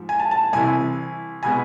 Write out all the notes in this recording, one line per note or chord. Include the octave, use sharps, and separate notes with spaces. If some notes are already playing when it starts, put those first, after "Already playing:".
Already playing: G#2 F3
G#5
A5
A5
C2 C3 E3 G#5
B2 G#3 B3 G#5